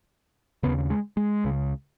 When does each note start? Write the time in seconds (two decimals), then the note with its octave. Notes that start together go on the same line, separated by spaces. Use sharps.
0.63 D#2 C#3 B3
0.90 G#3
1.17 G#3
1.44 C#2 C#3